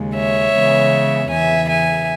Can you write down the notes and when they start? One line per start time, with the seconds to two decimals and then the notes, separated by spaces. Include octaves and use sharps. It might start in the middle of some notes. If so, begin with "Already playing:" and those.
Already playing: D#2 C#3 G#3
0.16 C#5 E5
0.54 C#3 E3 G#3 B3
1.30 E2 C#3 E3 E5 G#5
1.68 E5 G#5